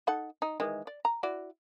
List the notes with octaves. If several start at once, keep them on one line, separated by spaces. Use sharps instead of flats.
D#4 A4 F#5
D#4
D#3 E3 G#3
D5
A#5
E4 F#4 D5